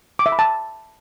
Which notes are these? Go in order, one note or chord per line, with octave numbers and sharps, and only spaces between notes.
D6
E5
B5
A5